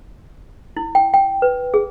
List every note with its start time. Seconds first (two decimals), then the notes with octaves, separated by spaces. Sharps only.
0.77 E4
0.95 G5
1.14 G5
1.42 B4
1.74 G#4